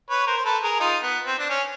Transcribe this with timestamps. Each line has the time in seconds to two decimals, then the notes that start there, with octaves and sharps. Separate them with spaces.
0.10 B4 C#5
0.27 A#4 C5
0.37 C5
0.45 A4 B4
0.63 G#4 A#4
0.80 D#4 F4
1.03 B3
1.26 C4
1.38 D4
1.49 C#4